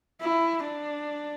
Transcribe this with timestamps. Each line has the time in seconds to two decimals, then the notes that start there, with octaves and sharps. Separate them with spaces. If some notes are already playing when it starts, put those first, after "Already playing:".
0.21 E4
0.63 D4